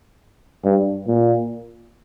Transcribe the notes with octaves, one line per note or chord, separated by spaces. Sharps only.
G2
A#2